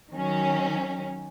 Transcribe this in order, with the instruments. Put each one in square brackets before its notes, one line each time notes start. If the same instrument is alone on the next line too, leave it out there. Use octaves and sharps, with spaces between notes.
[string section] D#3 F#3 C#4